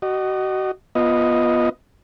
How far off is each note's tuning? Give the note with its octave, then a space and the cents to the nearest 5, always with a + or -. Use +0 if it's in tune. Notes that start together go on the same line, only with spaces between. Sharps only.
F#4 +35 D#5 -20
B3 -15 F4 +0 D#5 +0